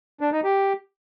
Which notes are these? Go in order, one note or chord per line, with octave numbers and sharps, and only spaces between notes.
D4
D#4
G4